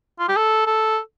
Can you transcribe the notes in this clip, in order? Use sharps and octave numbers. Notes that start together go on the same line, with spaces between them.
F4
G4
A4
A4